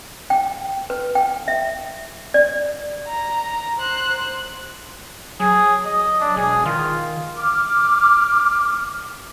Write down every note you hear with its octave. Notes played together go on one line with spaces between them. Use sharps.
G5
B4
G5
E5
D5
A#5
C5 F#6
F#3 G#4
D#5
D4
E1 G#4
D#3 F4
D6 F6